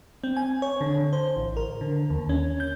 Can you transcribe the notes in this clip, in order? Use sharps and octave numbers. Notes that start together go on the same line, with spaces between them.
C4
G#5
C#5
D3
C5
A1
A#4
D3
D#2
C#4
G6